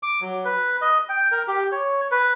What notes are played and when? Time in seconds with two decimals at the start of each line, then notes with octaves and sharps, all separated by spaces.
0.03 D6
0.21 F#3
0.45 B4
0.81 D#5
1.09 G5
1.32 A#4
1.48 G4
1.72 C#5
2.11 B4